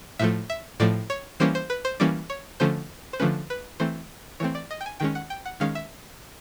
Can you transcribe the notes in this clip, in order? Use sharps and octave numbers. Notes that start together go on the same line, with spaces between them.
A2 F3 A3 E5
E5
A2 F3 A3 D5
C#5
E3 G3 A#3 C#4 C5
C5
B4
C5
E3 G3 A#3 C#4 D5
C#5
D3 F3 A3 C#4 C5
C5
D3 F3 A3 C#4 B4
B4
E3 A3 C4 C5
E3 A3 C4 C#5
D5
D#5
G5
G#5
D#3 G#3 C#4 G5
F#5
G5
F#5
D#3 G#3 C#4 F5
E5